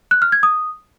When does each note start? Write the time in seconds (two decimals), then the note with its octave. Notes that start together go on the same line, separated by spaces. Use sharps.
0.11 F#6
0.22 F6
0.32 G#6
0.43 D#6